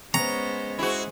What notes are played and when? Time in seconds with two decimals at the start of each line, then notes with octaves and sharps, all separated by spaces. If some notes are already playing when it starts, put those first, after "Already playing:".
0.14 G#3 B3 C#4 C5 C#5 A#5
0.79 E4 F#4 G#4 C5